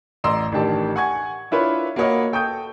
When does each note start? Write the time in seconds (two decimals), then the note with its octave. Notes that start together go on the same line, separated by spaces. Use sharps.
0.24 A1 D5 D#5 A#5 C6 E6
0.52 A1 D#3 D4 G4 A5
0.96 F#5 G#5 C#6 G#6
1.51 D4 E4 F4 B4 C#5
1.96 A#3 F#4 B4 C#5 D#5 F#5
2.32 A4 G5 C#6 D#6 G6